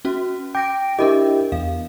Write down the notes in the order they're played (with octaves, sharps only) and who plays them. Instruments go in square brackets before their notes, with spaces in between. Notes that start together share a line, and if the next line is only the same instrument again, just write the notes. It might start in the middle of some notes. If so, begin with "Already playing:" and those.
[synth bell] C#4 F#4
[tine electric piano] G5 [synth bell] D6 A#6 D7
[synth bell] D4 A#4 D#5 [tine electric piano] E4 G4
[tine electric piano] E2 [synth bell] F5